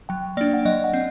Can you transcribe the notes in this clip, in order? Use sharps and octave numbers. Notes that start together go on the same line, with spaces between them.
F#3 G5
A#3 D4 D5
F#5
F#3 D#5
F#5
C4